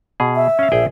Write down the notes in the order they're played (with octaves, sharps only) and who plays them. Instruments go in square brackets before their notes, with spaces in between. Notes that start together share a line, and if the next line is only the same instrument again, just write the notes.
[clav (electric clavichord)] B2 G#4
[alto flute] E5
[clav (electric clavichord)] C#4 F5
A#1 G#4 G5